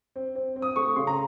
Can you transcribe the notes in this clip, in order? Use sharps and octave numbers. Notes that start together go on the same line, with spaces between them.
C4
C4
C4
D#6
A3 C#6
C#3 C6
A#5